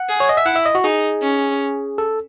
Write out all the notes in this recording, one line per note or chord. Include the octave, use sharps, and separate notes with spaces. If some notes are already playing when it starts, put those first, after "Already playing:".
Already playing: F#5
G#4
C#5
D#5
E5
E4 F#5
E5
D#5
F#4
D#4 G#4
C#4
A4